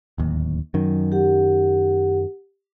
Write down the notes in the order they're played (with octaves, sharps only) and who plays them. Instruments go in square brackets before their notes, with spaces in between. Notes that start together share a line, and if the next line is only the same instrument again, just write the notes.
[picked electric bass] D1 D#2
[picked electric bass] F#2 D#3 [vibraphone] F#3
[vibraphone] G4 F#5